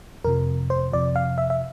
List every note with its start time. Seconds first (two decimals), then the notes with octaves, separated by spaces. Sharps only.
0.24 F2 C3 F3 A#4
0.70 C5
0.92 F2 C3 F3 D5
1.16 F5
1.38 E5
1.50 E5